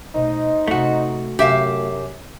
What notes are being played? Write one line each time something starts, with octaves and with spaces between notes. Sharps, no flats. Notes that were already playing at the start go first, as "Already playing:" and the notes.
B2 A3 D#4 C5 D#5
C3 A3 C4 F#4
F#2 C3 G4 E5 F5